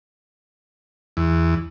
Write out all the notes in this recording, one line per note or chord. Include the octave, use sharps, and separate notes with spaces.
E2